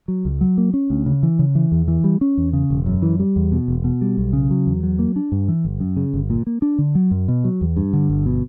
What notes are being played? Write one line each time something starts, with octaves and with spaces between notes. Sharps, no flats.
F#3
C#2
F#3
A#3
C#4
D2
C#3
E3
C#3
E3
E2
E3
G3
C#4
E2
C#3
E1
F#2
E3
G3
E2
B2
E1
B2
G3
B1
C#3
F#3
E2
F#3
A#3
D4
G2
E3
G1
F#2
C#3
G1
A#2
A#3
D4
D3
F#3
F#2
B2
F#3
E2
G2
D3
G1
B2